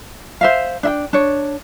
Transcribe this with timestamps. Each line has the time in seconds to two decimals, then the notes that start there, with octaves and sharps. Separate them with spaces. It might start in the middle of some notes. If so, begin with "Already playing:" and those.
0.41 C5 E5 F5
0.83 D4 E5 G5
1.13 D4 C#5